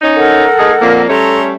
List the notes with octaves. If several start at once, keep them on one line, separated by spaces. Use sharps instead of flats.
C#4 D#4
A4 A#4 F#5
A3 D#4 G#4
F2 A#2 A#3
G3 A3 C#4 A4 A#5 C6